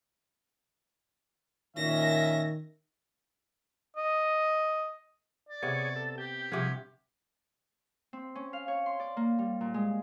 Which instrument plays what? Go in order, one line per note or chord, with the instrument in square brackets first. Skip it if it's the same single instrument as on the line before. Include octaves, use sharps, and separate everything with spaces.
[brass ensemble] A#2 C#4 E5 [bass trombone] D#3 [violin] A#6
[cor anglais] D#5
[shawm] D5
[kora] C3 B3 [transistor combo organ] G#4 C#5
[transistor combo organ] A4
[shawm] G4 [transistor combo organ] G5
[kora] G2 C3 F#5 [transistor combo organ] F3 G#4
[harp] C4
C#4
F5
C#5
C6
D5
A#3
G3
A#2
G#3